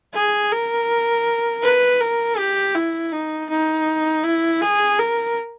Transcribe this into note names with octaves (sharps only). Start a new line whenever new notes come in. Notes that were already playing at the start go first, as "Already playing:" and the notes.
G#4
A#4
B4
A#4
G4
E4
D#4
D#4
E4
G#4
A#4